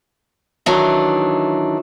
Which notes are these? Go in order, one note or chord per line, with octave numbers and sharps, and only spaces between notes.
D#3 E3 F#3 D4